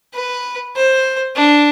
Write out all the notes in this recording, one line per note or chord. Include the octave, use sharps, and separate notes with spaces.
B4
C5
D4